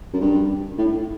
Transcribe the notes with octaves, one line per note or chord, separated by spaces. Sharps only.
F#2
G2
A2